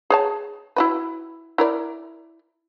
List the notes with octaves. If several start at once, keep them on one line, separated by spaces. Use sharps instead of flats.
G#4 C#5 A5
E4 F#4 B4
E4 A#4 D5